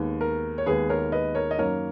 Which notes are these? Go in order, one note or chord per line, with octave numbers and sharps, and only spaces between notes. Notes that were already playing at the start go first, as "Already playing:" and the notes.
Already playing: D#2 D#3 G#3 B3
A#4
C#5
D#2 D#3 G#3 B3 G#4 B4
A#4 C#5
B4 D#5
A#4 C#5
D#5
F#2 D#3 F#3 A#3 A#4 C#5